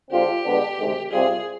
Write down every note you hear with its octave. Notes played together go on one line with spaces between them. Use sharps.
D3 G#3 C4 F4 G4
D3 G#3 B3 D4
D2 C3 D#3 G#3 C4
C2 C3 G3 C4 F4 G#4